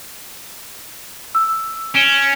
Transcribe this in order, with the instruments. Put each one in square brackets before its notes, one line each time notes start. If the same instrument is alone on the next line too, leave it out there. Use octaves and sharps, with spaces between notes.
[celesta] E6
[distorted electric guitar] C#4 [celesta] D7 E7 G7